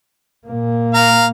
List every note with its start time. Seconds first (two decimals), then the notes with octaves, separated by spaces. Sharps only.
0.47 A#2 A#3
0.94 F5 A#5